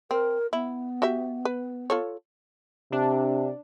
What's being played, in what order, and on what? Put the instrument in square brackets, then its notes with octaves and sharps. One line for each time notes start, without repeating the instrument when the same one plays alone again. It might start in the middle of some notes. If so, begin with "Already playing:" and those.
[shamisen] C4 [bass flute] A#4
[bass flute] B3 [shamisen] E4
[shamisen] F#4 G4 E5
B4
F4 A4 C#5
[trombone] C3 [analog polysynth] D4